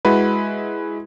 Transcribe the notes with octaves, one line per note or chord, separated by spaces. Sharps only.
G#3 E4 F#4 B4